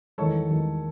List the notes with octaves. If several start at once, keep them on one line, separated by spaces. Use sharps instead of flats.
E2 D#3 G#3 A4 C#5
E2 D#3 G#3